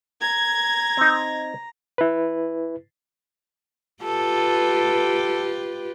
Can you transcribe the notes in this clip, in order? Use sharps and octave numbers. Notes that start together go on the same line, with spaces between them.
A#5 G#6
C4 D#4
E4 B4
F4 G4 A4 B4